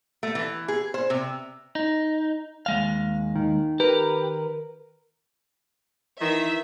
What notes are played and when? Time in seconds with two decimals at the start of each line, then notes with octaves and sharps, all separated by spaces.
0.23 A3
0.35 E3
0.68 G#4
0.94 C5
1.10 C3
1.75 D#4
2.66 D#2 G#3 F5
3.35 D#3
3.80 G4 A#4 B4
6.21 D#3 E3 E5